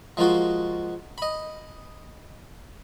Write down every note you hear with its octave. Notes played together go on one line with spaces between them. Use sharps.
F3 G#3 A#3 F4 F#4
D#5 B5